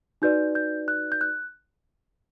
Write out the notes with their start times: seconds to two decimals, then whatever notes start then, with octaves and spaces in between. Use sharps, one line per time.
0.22 D#4 F#4 B4 D5 G6
0.55 G6
0.88 F#6
1.12 G6
1.21 F#6